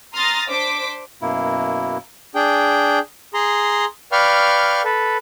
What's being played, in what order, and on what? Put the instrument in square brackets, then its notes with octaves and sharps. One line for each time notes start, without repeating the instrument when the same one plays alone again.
[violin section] A#5 C6 D#6 F6 A6 A#6
D4 C5 D6 B6
[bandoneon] F#2 B2 A#3 E4
[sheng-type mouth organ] D4 G#4 G5
G#4 A#5 C6
B4 D5 F5 G5 C#6 F6
A4 B4